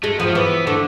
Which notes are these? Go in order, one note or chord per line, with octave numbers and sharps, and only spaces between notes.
G#3 A3
F3 B3
A3
E3 B3
D3 A3